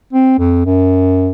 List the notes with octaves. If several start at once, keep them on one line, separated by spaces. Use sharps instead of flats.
C4
F2
F#2